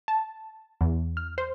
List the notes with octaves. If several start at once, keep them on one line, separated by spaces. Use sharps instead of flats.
A5
E2
F6
C5